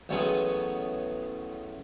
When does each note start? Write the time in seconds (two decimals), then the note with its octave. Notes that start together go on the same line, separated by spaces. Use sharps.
0.09 A1 F#3 A3 B3 C#4 G#4